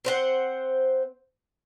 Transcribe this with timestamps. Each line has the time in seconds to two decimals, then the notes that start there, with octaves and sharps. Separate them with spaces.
0.05 C4 C5 F#5